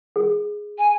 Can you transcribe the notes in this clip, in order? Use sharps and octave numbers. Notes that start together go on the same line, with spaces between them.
G#4
G#5